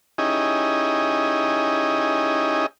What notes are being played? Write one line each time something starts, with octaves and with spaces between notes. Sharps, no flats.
C#4 D#4 E4 G4 G#4 D#5